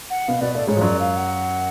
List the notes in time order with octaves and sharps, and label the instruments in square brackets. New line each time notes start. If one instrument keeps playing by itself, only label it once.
[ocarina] F#5
[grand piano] B2 B3 [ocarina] F5
[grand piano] B2 B3 [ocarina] D5
[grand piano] A2 A3 [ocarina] D5
[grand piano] G#2 G#3 [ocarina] C#5
[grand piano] F3
[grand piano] F#2 F#3 [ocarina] D5
[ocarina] F5
F#5